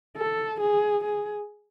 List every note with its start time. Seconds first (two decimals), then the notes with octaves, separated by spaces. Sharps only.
0.17 A4
0.61 G#4
1.04 G#4